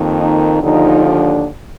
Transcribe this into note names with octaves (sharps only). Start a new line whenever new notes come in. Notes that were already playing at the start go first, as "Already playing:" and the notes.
Already playing: F2 D#3 A#3
D#4
D#2 D3 F3 D#4
D4